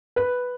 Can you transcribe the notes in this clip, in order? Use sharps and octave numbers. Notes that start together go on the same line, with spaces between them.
B4